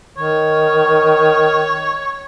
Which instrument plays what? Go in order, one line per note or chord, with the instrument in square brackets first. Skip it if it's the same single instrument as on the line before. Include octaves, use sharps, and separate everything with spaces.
[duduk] D#3 [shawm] C#5